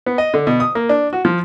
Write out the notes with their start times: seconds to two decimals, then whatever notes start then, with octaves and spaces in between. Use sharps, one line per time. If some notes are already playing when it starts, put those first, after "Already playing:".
0.06 B3
0.18 D#5
0.34 D3
0.47 B2
0.60 D#6
0.75 A#3
0.89 D4
1.13 F#4
1.25 F3